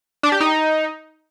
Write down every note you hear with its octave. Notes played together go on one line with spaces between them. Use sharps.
D4
G4
D#4